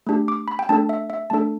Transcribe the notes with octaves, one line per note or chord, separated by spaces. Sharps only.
A3 D4 G4
D6
B5
G5
A3 D4 A4 A5
E5
E5
A3 D4 A4 A5